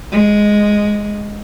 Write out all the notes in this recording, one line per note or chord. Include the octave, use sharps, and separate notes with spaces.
G#3